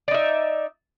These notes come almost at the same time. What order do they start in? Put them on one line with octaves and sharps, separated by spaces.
D5 D#4 E5